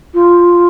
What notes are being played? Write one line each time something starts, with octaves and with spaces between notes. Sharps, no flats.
F4